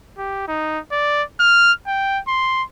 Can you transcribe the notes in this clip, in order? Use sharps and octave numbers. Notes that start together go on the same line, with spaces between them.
G4
D#4
D5
F6
G5
C6